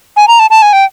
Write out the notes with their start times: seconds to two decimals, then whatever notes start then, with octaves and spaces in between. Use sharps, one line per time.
0.16 G#5
0.28 A#5
0.39 A5
0.50 A5
0.62 G#5
0.73 G5